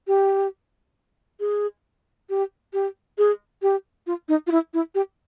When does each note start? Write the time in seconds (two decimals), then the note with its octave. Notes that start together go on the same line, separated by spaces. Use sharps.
0.07 G4
1.40 G#4
2.30 G4
2.73 G4
3.18 G#4
3.62 G4
4.07 F4
4.29 D#4
4.47 F4
4.51 E4
4.74 E4
4.95 G4